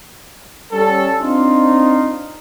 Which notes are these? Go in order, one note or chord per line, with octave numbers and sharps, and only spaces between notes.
G3 C#4 A4
C4 D4 D#4 F4